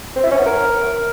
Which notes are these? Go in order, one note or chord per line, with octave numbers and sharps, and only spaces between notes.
C4
E4
C#4
B3
A#4